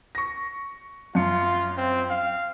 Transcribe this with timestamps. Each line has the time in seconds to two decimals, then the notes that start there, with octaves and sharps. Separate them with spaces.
0.15 C#6 A#6
1.15 F#2 F4 C#7
1.77 C4
2.10 F5